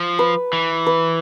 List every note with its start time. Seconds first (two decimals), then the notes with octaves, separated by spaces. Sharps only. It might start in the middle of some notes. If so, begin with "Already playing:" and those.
Already playing: F3
0.19 B4
0.53 E3
0.86 B4